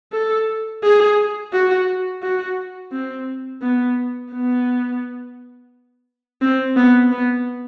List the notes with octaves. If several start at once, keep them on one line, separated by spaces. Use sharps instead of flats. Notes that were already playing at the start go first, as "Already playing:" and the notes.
A4
G#4
F#4
F#4
C4
B3
B3
C4
B3
B3